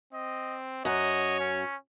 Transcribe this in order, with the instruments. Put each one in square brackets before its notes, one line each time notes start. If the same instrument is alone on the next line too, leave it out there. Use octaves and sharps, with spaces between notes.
[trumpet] C4 [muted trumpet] D#5
[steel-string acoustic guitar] F#2 F#5 [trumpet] C#5 [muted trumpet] D#5
[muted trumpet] C#4